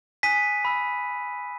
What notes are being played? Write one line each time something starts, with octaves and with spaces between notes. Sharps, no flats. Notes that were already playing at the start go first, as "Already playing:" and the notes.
G#5 D#6 F#6 B6 D#7
B5 E6